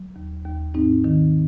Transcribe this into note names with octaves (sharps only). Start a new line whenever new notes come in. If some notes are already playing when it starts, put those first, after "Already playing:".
Already playing: F#3
D#2
D#2
G#2 C4 D#4
D#3